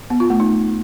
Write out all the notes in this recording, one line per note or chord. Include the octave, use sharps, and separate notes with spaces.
B3
F4
A3
D#4